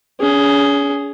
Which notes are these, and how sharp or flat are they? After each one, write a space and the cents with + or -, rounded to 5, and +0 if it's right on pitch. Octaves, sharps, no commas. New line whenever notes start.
C#4 +40 G#4 +0